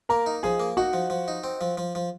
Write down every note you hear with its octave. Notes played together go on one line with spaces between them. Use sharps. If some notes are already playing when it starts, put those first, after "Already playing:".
A#3 A#4 A#5
D#4
F3 G#4 G#5
A#3
D#4 F#4 F#5
F3
F3
D#4
C4
F3
F3
F3